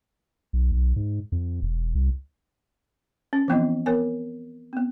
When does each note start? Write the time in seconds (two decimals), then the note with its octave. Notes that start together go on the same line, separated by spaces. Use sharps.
0.53 B1
0.72 B1
0.96 G#2
1.32 F2
1.62 E1
1.95 C2
3.33 C#4
3.48 E3 F3 B3 C4 E4 D#5
3.86 B3 A#4 C#5 G#5
4.73 B3 C4